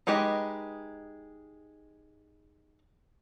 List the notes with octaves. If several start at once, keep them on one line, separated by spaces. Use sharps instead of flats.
G#3 D#4 G4 B4 D#5